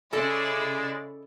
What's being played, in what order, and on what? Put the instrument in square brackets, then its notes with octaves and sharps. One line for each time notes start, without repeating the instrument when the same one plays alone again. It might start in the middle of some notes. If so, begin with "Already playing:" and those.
[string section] C#3 E4 D5 [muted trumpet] G#3 [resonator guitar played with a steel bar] A4 D#5 A5